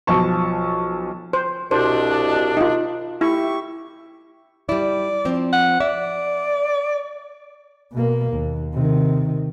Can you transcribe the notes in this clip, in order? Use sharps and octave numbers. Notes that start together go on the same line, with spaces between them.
B1 F3 A5 C#6
C5
C2 B2 D4 C5
D#4 F4
E4 G4 E5 C#6
G3 E4 D5
F3 C4
F#5
D5 E5
B2 A#3
D#2
C3 D#3